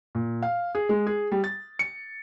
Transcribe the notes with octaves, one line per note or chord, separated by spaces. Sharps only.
A#2
F5
G#4
G#3
G#4
G3
A6
C#7